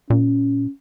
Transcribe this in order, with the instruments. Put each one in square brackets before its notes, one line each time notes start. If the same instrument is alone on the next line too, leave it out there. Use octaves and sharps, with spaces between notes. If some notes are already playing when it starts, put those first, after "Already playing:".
[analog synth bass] A#2 [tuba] C#4